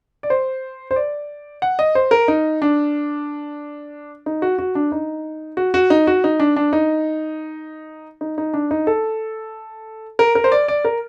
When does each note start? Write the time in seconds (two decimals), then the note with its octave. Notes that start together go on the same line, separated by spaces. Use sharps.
0.23 D5
0.30 C5
0.91 C5
0.96 D5
1.62 F#5
1.79 D#5
1.95 C5
2.11 A#4
2.28 D#4
2.62 D4
4.26 D#4
4.42 F#4
4.59 F#4
4.75 D4
4.92 D#4
5.57 F#4
5.74 F#4
5.90 D#4
6.07 F#4
6.24 D#4
6.40 D4
6.56 D4
6.73 D#4
8.21 D#4
8.38 D#4
8.54 D4
8.71 D#4
8.87 A4
10.19 A#4
10.35 A#4
10.44 C5
10.52 D5
10.68 D5
10.85 A#4